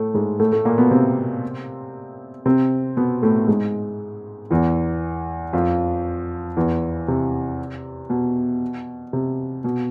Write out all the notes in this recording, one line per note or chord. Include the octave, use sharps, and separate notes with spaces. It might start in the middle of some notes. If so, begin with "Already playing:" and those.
Already playing: A2 A3
G#2 G#3
A2 A3
A2 A3
A#2 A#3
B2 B3
C3 C4
C3 C4
B2 B3
A2 A3
G#2 G#3
E2 E3
F2 F3
E2 E3
C3
B2
C3
B2